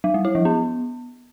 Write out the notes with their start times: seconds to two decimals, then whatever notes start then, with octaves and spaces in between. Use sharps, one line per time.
0.04 F#3
0.14 G3
0.25 E4
0.35 F3
0.45 B3